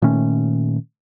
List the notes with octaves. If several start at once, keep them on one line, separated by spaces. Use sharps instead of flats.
A#2 D#3 A3 C#4